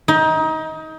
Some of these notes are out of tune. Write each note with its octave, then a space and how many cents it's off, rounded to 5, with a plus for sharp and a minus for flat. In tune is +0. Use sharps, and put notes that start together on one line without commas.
D#4 +25